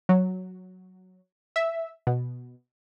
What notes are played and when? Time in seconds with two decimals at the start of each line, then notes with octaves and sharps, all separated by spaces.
0.09 F#3
1.56 E5
2.07 B2